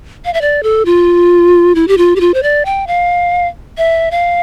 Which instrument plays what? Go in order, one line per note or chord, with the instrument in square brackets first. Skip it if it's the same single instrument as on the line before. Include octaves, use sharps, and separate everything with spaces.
[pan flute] F5
E5
D5
A4
F4
E4
G4
F4
G4
F4
C5
D5
G5
F5
E5
F5